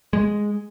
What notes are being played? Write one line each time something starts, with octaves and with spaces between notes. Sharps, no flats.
G#3